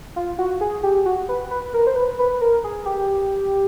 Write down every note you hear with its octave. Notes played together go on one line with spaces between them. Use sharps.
F4
F#4
G#4
G4
F#4
B4
B4
A#4
C5
B4
B4
A#4
G#4
G4